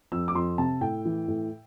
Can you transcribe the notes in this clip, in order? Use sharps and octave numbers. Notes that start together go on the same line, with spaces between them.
F2 E6
D6
F2 C6
C3 A5
A2 G5
E3
A2